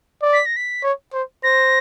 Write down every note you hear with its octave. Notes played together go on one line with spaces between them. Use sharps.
D5
B6
A#6
B6
C#5
C5
C5 A#6